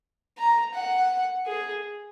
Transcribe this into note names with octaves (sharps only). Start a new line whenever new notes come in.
A#5
F#5
G#4